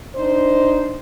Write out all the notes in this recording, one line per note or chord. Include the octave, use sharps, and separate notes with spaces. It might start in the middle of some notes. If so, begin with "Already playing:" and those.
D4 D#4 C5